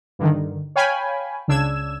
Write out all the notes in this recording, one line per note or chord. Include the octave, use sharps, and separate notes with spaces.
G2 D3 D#3
C#5 F5 G5 G#5 B5
C#2 C#3 D4 E6 G#6 E7